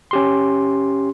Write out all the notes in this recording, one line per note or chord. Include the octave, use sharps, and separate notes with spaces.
C#4 G4 C6